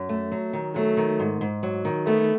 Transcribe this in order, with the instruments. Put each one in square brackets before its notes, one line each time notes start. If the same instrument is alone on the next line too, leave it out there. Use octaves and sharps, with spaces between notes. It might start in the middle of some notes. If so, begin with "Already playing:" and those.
Already playing: [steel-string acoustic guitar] F#2
A3
F#3
D#3
[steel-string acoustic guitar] F#3 [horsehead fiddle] A3
[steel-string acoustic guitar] D#3
G#2
G#2
F#3
D#3
[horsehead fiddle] A3 [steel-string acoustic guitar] B3